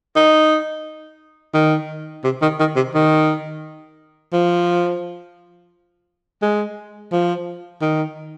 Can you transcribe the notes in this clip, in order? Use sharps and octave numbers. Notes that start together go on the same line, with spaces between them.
D#4
D#3
C3
D#3
D#3
C3
D#3
F3
G#3
F3
D#3